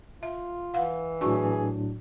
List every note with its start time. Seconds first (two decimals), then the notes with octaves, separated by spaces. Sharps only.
0.23 F4 E5
0.74 E3 F5 F#5
1.21 A2 F#3 D4 F#4 G#4 C#6